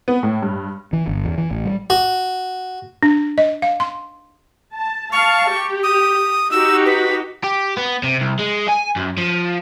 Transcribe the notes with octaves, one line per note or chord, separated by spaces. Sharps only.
B3
A2
G2
E3
G1
E2
E3
A1
G3
F#4
D4
D#5
F5
C6
A5
F5 A5 C#6
G4
D#6
D#4 F#4 G4 E6
B4
G4
B3
C3
C2
G#3
G#5
F#2
F3